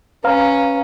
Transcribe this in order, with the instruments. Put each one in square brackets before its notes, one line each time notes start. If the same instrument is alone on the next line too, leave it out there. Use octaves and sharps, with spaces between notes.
[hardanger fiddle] C#4 [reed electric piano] B4 F5 A#5